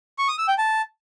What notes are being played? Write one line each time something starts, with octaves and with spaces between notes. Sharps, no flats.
C#6
D#6
E6
G5
A5